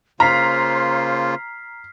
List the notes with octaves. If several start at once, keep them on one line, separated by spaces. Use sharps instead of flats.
C#3 A#3 F4 C5 A#5 F6 B6 C7